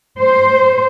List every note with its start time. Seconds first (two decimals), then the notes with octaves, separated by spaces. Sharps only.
0.21 C5